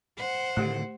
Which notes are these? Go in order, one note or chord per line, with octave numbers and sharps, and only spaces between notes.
C5 F#5
A2 D3 D#3 A3 G4